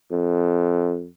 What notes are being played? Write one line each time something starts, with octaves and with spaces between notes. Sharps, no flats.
F2